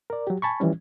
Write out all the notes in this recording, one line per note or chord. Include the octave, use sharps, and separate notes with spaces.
A#4 D5
F#3 G4
G#5 A5 B5 C#6
E3 F3 G3 C#4